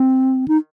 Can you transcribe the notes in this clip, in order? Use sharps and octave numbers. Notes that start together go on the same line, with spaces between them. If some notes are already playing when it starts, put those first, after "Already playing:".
Already playing: C4
D#4